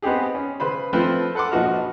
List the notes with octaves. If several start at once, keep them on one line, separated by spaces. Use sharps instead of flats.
B3 C4 D#4 G4 G#4
C#4
C#3 B4 C5 B5
F3 A3 C4 F4 B4
A4 B4 F#5 C6 D6
A#1 F3 D#4 F#4 B4 F6